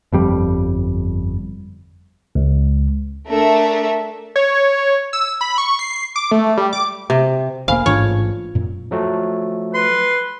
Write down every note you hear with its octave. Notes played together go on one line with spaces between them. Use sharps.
G1 F2 G3
C#2
A3 D4 A#4 E5
C#5
E6
B5
C#6
C7
D6
A3
G3
D6
C3
E1 A#3 C5 F5 G#5 B5
A1 G#2 D4 F4 C#5
F#2 A#2
F3 F#3 A3
B4 C6